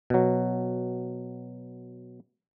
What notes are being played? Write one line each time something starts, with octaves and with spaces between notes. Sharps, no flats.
B2 F#3